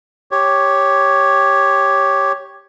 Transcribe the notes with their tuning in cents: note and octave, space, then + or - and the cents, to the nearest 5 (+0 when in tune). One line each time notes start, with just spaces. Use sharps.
G4 +0 C#5 +0